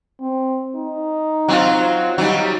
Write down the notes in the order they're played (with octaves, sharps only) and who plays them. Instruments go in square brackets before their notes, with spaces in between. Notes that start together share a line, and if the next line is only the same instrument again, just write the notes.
[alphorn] C4
D#4
[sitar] F#3 C4 F4
[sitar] F#3 G3 [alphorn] D#4